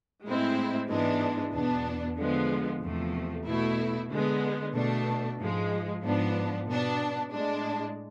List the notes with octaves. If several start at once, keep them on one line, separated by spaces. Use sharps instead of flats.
A2 G#3 C4 E4
G#2 E3 G#3 B3 D4
E2 B2 B3 D4
D3 F3 G#3 B3
E2 C3 F3 A3
B2 A3 E4
D3 G#3 B3
B2 A3 D4
G#2 F3 G#3
G#2 F3 B3 D4
B2 B3 D4
A2 G#3 D4